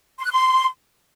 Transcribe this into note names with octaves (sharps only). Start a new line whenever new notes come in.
C6
F#6
C6